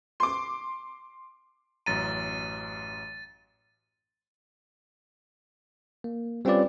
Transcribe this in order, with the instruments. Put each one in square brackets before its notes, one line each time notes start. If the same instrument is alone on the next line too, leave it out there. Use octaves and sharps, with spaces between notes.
[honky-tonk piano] C6 D6
[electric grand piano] A1 F#2 A#5 [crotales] A6 D#7
[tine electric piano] A#3
G3 C4 C#4 F4 B4 D5